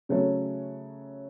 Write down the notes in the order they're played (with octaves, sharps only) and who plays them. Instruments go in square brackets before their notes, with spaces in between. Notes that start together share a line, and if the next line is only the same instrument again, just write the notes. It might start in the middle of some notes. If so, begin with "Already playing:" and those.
[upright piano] C#3 F#3 A3 C#4